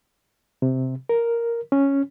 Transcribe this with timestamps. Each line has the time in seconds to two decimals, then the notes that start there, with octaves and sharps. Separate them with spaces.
0.62 C3
1.09 A#4
1.72 C#4